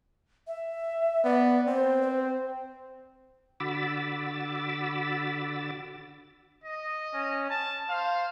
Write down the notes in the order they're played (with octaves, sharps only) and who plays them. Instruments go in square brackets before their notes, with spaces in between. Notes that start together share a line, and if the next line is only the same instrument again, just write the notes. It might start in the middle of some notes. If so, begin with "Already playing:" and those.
[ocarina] E5
[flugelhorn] B3 [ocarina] D5
[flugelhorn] C4 [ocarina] C5
[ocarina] C5
[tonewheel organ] D3 F#4 B5 D6 E6 A6
[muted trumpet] D#5
[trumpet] C#4
A5
[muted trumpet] C5 [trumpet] F5